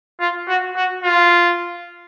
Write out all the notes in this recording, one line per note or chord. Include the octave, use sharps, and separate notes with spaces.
F4
F#4
F#4
F4